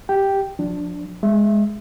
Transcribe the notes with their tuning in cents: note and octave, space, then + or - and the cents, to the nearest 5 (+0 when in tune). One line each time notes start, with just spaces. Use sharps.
G4 +0 G5 +0
F3 +35 D4 +0
G#3 +0 E5 +10